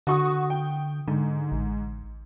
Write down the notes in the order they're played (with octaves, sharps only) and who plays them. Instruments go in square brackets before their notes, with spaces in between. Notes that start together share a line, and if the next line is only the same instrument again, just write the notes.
[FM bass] D3 [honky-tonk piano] F#4 C#6 D#6
[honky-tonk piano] G5
[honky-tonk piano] G#2 [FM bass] D3
[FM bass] A1